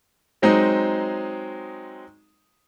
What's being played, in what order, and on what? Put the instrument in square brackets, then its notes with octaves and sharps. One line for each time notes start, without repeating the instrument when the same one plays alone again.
[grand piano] F#3 G#3 C4 D#4